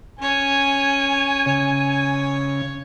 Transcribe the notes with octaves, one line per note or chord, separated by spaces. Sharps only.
C#4 C#5 G#5
C#3 C#5